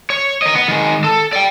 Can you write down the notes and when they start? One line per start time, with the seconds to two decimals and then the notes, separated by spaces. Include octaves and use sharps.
0.10 C#5
0.42 A#4 D#5
0.55 B3
0.68 D#3 G#3
1.04 A4
1.33 D5 G5